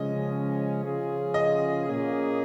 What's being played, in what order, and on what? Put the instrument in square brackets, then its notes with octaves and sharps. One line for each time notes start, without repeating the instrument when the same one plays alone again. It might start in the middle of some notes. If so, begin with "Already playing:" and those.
Already playing: [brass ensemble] C#3 F3 G#3 C#4 [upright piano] D#5
[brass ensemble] C#3 F3 C#4 F4 G#4
[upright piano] D#5
[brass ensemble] A#2 A#3 C#4 G#4